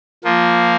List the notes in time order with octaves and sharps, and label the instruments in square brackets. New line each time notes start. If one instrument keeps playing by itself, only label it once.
[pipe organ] F3 A#3 F4